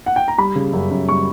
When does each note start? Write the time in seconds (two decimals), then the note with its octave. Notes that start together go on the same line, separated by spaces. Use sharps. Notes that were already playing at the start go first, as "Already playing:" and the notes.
0.06 F#5
0.16 G5
0.28 A#5
0.38 G3 B5
0.56 C#3
0.73 F#2
0.91 F#2
1.09 G3 C#6